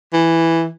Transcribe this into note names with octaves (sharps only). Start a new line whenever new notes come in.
E3